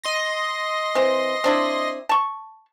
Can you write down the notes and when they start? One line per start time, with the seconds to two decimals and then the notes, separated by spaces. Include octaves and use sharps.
0.04 D#5 C6 A#6
0.95 E3 C4
1.44 C4 D4 E4
2.09 A5 C#6